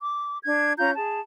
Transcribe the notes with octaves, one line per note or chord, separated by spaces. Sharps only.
D6
D4 G#6
C#4 F4 A#5 G6
G#4 A5